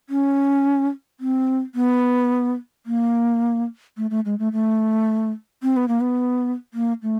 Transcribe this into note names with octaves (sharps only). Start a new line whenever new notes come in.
C#4
C4
B3
A#3
A3
A3
G#3
A3
A3
C4
B3
A#3
B3
A#3
A3